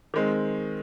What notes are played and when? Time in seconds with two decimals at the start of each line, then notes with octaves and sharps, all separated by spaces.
0.14 D#3 G#3 C4